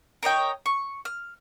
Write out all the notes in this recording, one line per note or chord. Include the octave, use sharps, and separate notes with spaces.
A#4 C#5 D#5 G5
C#6
F6